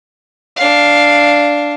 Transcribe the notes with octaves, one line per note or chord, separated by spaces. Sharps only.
D4 F5